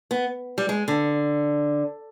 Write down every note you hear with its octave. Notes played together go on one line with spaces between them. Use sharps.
B3
G3
G#3
D3